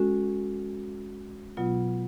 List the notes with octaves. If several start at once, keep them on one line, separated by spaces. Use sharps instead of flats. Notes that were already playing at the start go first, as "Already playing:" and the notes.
Already playing: G#3 C#4 F#4 A4
B2 F#3 B3 F4